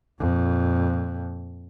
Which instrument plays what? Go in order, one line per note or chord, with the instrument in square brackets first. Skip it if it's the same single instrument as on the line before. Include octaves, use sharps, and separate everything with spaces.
[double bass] F2 A#2